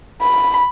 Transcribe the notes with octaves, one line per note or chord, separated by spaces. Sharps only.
B5